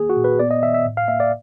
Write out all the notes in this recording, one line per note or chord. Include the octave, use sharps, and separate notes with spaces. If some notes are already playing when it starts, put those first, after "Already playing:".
Already playing: D#3 A#3 G#4
F#4
A#2
B4
B3 D5
D#5
D#3 E5
E5
A2
F5
A#3 E5
D5